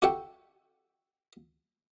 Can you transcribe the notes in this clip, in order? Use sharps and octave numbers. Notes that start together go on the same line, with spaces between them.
F#4 G4 A4 E5 F#5 G5